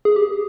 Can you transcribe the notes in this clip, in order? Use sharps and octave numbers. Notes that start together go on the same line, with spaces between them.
G#4
G4